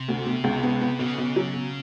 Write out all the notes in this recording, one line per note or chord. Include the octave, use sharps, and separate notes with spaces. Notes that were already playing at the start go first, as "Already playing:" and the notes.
Already playing: C3
D2
B2
C#2
B3
B3
B1 C#3
B1
F#3
B2